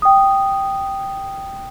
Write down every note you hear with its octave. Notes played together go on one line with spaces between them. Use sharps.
G5 D#6